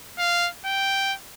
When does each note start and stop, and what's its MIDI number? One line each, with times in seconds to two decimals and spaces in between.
0.19 0.49 77
0.65 1.15 79